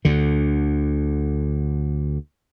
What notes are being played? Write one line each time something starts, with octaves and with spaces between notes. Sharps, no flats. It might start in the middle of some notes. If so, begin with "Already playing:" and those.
D2 D3